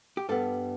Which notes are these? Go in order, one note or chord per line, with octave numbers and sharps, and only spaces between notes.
G4
G2 G3 B3 A4